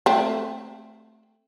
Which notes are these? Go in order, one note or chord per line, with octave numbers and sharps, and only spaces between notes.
A3 C4